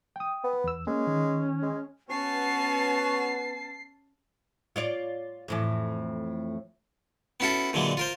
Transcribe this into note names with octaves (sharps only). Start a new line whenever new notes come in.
G5 D#6
B3
E2 E6
G#3 A#3 C#4
D#3
G#3
B3 C#4 F#4 C#5 G#5 A5 C7
F4 C#5 D5
F2 A2 E3
B3 C#4 E4 F#4 A4
A#2 D3 E3 F#3 G#3
F4 A#4 C5